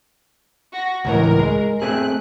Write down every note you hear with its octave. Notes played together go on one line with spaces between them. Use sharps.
F#4 A#6
C#2 A2 E3 A#4
G#3
A3 C4 G#4 F#6